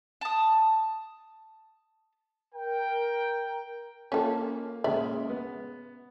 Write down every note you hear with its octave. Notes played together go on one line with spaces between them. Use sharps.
A5 D#6
A#4 G5
A#3 C#4 F4 A4
A#2 C#3 G#3 D5 E5
B3